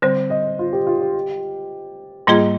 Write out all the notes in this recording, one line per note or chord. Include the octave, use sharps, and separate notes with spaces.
D3 G3 C4 C5
D#5
F4
G4
F4
G4
G#2 G3 A#3 F4 G#4 D#5